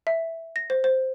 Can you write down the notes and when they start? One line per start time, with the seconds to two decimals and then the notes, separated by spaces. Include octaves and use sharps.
0.07 E5
0.56 A#6
0.70 C5
0.84 C5